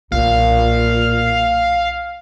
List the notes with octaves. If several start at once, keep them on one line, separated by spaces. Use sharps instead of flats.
B1 A#2 D#4 F5